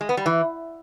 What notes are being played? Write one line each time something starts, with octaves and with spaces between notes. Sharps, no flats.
G#3
B3
G3
E3